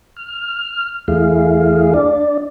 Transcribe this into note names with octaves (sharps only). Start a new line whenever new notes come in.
F6
E2 A3 E4 G#4 F5
D4 D5